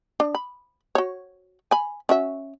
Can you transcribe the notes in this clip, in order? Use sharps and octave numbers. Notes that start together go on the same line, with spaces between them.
D4
B5
F#4 C#5
G#5 B5
C#4 F#4 E5